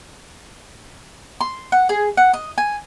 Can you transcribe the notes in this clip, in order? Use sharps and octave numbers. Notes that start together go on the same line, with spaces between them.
C6
F#5
G#4
F#5
D#5
G#5